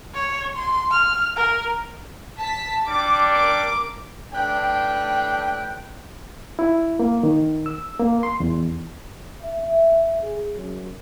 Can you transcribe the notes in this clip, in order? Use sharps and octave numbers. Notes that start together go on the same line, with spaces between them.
C#5
C6
F6
A#4
A5 B6
G3 D4 D6
A#4 D6
A2 D4 B4 G5
E4
A#3
D#3
E6
A#3
C6
E2
E5
G#4
F#2